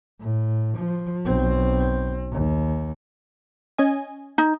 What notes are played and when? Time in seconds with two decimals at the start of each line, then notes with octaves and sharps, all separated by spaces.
0.20 A2
0.78 F3
1.26 B1 C4
2.32 D#2
3.78 C#4 D#5 G#5
4.38 D#4